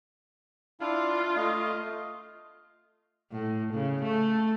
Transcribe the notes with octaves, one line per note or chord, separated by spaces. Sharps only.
D4 E4 F4 F5
A3 D#5 F5
A2
C#3
A3